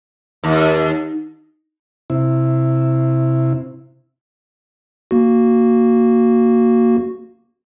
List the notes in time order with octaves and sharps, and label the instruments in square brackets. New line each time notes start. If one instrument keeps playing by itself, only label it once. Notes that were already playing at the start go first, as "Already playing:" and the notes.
[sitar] D#2
[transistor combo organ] C3 E4
[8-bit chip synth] A#3 F#4